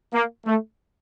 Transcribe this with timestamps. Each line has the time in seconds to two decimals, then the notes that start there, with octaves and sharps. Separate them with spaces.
0.13 A#3
0.46 A3